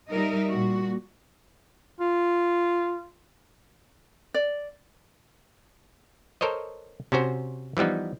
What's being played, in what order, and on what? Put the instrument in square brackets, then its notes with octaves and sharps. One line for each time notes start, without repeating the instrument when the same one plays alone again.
[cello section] G3 D#4 A#4 D#5 E5
A#2 G3 F#4
[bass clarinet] F4
[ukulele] D5
[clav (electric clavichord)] A4 A#4 C5 C#5 D#5
C3 C#4 F#4 C5
E3 F3 G3 B3 D#4